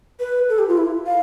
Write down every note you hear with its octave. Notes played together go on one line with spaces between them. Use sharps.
B4
A4
G4
F4
E4
F5